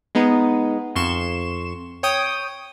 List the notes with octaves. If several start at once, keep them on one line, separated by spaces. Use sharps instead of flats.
G#3 B3 D#4
F2 C6 C#6 E7
C#5 G5 D#6